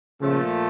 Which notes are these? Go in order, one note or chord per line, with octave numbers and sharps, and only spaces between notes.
A#2 C#3 F3 A3